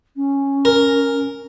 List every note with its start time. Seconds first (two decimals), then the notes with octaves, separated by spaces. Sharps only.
0.16 C#4
0.65 A#4